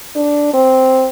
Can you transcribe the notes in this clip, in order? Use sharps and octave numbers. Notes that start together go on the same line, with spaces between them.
D4
C4